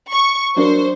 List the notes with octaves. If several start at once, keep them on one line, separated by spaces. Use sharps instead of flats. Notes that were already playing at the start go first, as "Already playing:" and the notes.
C#6
F#3 D4 A#4 C5